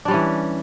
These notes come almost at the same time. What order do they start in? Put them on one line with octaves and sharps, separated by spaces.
D4 G3 C#4 E3